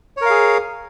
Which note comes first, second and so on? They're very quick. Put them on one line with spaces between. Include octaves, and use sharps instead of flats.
C#5 A#4 F5 G#4